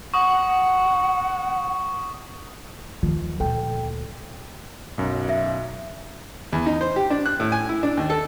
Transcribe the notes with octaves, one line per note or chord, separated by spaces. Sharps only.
F#5 C#6 D#6
D#2 D#3 F3
D2 A#2 A4 G5
B1 F#2
E5
E2
D#4
C5
G4
D4
F#6
A2
G#5
E4
D4
D#2
A4